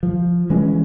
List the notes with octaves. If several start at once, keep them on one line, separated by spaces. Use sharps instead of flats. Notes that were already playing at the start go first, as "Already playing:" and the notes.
F3
E3 G#3 C#4